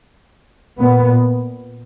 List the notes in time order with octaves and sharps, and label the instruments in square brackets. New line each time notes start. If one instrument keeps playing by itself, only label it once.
[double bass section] A#2 B3